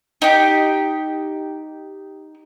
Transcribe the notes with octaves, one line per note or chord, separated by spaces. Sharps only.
D#4 G4